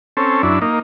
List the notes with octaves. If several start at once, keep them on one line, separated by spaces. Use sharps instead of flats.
C4 C#4 A4
F#2 D4 E4
A#3 D#4